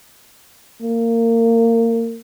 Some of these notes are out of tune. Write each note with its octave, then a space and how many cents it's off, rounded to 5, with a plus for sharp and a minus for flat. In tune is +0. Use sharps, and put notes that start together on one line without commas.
A#3 -25